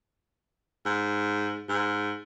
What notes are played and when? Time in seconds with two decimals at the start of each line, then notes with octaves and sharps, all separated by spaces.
0.86 G#2
1.69 G#2